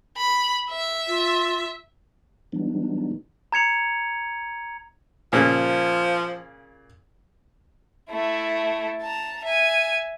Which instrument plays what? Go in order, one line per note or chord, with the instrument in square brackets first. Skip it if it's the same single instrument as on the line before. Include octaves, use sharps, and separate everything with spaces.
[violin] B5
E5
[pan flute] F4
[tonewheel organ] E3 F#3 G3 B3 D4 D#4
[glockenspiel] A#5 G#6 C#7 F7
[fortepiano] A#2 C#3 [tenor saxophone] F3
[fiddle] A3 E4
A5 A#5
E5 G#5